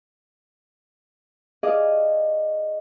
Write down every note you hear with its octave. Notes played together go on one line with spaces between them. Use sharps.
G#4 D5 D#5 F5